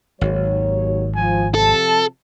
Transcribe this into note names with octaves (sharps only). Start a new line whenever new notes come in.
G#1 D#2 F#3 C#5
F3 G#5
C3 F3 A4 A5